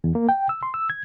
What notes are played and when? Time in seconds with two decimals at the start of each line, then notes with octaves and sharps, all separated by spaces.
0.04 E2
0.15 A#3
0.29 G5
0.49 E6
0.63 C6
0.74 E6
0.90 G#6